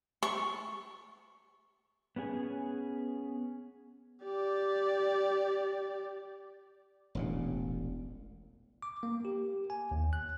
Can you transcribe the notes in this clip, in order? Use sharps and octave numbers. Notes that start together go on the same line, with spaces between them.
C#6
B3 C#4 G4 G#4
G4 D5
E1 A1 A#2
D6
A#3
G4
G#5
D#2
F#6